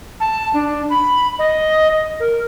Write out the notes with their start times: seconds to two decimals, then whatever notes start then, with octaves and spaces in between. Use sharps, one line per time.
0.20 A5
0.54 D4
0.90 B5
1.39 D#5
2.20 A#4